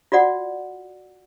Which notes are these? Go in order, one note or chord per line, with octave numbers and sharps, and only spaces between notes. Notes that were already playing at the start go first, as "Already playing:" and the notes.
F4 F#4 D5 F#5